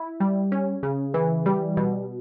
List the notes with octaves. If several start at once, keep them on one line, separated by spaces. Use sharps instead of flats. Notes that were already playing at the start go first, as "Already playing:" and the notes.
Already playing: E4
G3
C#4
C#3
E3
G3
B2